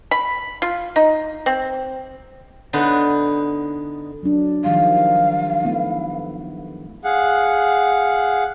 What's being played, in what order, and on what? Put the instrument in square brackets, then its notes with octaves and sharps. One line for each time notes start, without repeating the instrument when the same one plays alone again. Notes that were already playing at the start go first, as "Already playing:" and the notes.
[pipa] B5
F4
D#4
C4
[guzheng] D3 B3 D#4
[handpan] F#3 D4
[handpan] D#3 F3 G3 [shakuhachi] F5
[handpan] A3 B3 E4
[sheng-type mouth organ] G#4 F5 F#5